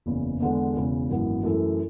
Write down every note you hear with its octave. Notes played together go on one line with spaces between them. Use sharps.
F#1 E2 C#3
E2 D3 G#3 B3
E1 E2 C#3
G#1 F#2 E3 B3
F#2 E3 A3 E4 A4